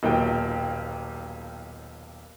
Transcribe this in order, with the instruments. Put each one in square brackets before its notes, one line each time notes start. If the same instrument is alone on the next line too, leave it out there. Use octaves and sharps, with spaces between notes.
[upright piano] D#1 B1 A#3 G5